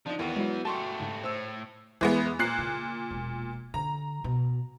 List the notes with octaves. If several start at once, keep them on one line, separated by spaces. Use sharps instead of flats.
F3 D4 D#4 A5
D#2 E3 B3 E4 A4 D#7
F#3 G#3 E4
A3 F#4 G4 A5 C6 C#6
G#2 C#3
A2 C5 E6
E2 E3 G#3 B3
A#2 F#6 C7
C#3
E1
D3 A#5
B2